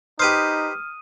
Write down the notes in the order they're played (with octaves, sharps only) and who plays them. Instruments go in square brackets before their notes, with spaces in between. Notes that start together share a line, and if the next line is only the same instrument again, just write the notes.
[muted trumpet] D#4 [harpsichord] G4 B4 C5 [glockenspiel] D#6 D#7 [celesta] F6